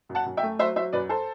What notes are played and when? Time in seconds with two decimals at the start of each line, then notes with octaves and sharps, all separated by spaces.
0.09 F#2
0.15 F#5 A5
0.26 F#2
0.37 E5 G5
0.43 A3
0.59 F#3 C5 E5
0.76 F#3 C5 E5
0.93 F#2 B4 D5
1.09 A4 C5